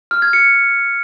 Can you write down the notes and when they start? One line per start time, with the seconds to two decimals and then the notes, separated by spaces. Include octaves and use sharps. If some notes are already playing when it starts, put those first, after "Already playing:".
0.11 F6
0.22 G#6
0.33 C#7